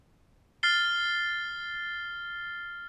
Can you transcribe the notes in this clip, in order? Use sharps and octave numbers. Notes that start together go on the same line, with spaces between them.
F6 A6 C7 G7